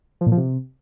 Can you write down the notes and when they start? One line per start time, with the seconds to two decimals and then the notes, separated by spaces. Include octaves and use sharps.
0.21 F3
0.26 A#2
0.32 F3
0.37 C3